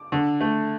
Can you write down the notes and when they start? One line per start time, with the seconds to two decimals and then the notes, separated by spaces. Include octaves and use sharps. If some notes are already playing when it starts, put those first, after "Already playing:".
Already playing: D6
0.12 D3
0.41 A3